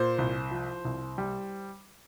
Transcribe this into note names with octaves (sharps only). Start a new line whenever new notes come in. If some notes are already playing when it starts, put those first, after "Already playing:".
Already playing: A#2 C5
C2
F3
C2
G3